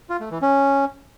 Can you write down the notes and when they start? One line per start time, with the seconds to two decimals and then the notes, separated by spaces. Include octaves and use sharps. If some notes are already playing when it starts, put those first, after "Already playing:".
0.10 F4
0.20 A3
0.31 E3
0.42 C#4